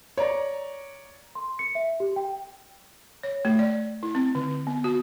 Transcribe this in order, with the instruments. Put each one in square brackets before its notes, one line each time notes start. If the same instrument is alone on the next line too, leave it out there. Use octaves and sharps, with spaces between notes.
[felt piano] C#5 D5 A#5
[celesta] C6
C#7
E5
G4
G5
[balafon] C#5
A3
D5
E4
C4
D3
B3
F#4